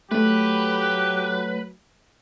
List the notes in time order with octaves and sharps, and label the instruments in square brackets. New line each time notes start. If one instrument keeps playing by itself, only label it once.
[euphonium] F#3 [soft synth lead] A3 [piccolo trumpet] G4 [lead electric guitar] B4